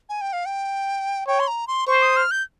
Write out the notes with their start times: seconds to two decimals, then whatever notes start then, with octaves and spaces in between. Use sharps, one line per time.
0.09 G#5
0.21 G5
0.33 F5
0.46 G5
1.27 C#5 G5
1.40 C6
1.47 A#5
1.67 C6
1.87 C5 C#6
2.02 D#6
2.16 F6
2.31 G6